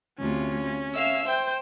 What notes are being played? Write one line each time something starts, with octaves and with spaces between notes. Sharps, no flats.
D2 C3 C#4 F4
E5 F5 E6
C5 G5 G6